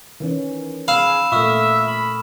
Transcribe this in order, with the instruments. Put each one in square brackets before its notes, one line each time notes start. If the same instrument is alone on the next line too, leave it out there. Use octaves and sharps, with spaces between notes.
[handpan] D#3 E3 C#4
[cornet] G#4 [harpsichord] F5 [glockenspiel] B5 E6 E7
[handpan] A#2 A3 [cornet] E5 [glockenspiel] C#6 D#6 F6
[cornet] B5